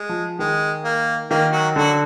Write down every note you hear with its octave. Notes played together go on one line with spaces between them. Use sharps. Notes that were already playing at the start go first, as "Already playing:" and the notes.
Already playing: G#3
F3
D#3 G#3
A#3
D#3 A#3
F#3 F#4
D3 F#3 F#4